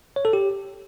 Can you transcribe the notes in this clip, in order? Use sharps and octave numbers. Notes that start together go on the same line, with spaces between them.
C#5
A4
G4